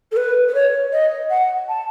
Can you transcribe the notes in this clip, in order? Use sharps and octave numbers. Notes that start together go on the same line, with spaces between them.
A4
B4
B4
C#5
D#5
F#5
A5